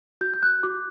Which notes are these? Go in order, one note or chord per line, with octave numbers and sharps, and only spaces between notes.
F#4 G6
G6
F#6
F#4 D6